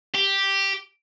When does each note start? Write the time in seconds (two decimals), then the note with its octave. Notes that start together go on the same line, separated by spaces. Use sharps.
0.15 G4